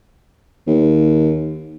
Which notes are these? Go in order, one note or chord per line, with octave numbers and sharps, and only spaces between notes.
D#2